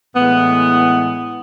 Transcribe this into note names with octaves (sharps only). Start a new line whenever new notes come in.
A2 E3 G#3 B3